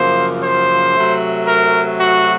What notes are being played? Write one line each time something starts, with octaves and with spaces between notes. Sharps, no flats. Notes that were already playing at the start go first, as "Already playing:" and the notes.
Already playing: F#2 C#3 F3 A#3 C5
C5
C3 F#3 A3
A#4
F#4